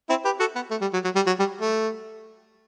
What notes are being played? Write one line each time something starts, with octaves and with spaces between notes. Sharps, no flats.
C4 E4
G4 B4
F#4 A4
B3
A3
G3
F#3
F#3
G3
F#3
G3
A3